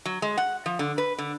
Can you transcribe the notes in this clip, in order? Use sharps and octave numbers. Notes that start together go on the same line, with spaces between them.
F#3
G#3
F#5
F3
D3
B4
D3